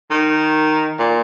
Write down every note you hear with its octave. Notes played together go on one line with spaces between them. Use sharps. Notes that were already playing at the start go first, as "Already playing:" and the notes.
D#3
A#2